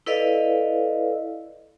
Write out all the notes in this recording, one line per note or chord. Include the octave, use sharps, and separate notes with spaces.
E4 A4 B4 D5 D#5 F5